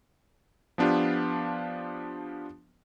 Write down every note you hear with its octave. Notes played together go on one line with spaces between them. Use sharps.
F3 B3 D4 F4 G4